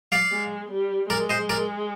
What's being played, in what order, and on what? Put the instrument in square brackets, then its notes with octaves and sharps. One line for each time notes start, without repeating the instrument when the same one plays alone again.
[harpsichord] D5 F5
[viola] G#3
G3
[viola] G#3 [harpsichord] A#4 D5
[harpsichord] C5 D#5
A#4 D5